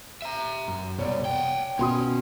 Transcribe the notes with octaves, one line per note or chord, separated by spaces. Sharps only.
E5 A#5
F#2
C2 B2 C#5 D5
F#5 G5
B2 C#4 C6 D#6